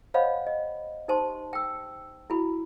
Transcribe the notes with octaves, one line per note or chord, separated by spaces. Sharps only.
C5 C#5 D#5 F5 F#5 B5
D#5
D#4 G4 C5 A5 C6
G5 E6
E4 F#4 B5